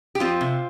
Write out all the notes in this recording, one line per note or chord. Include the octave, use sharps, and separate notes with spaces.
G4
F3 C4 F4
C3